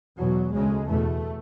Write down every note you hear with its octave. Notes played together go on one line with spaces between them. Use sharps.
E2 B2 F#3
D2 C#3 G#3
E2 B2 A3